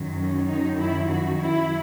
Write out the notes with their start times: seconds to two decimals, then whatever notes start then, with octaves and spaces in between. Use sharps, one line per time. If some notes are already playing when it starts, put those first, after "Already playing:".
Already playing: F#2 D#3 F#3
0.16 C#4
0.47 D#4
0.79 E4
1.09 F#4
1.40 E4